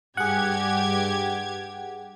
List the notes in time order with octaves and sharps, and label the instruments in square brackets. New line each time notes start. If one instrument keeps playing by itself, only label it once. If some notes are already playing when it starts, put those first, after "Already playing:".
[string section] G2 G4 G#6 [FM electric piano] G#4 F#5